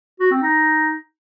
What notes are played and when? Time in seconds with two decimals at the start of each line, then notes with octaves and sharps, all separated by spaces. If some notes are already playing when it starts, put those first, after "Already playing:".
0.20 F#4
0.31 C4
0.42 D#4